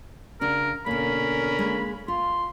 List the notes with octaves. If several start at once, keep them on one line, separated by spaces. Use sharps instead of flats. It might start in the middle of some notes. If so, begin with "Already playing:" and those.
C#3 D4 F#4 A#4
B2 D3 A#3 C#4 A#4 B5
G#3 A#3
F4 C6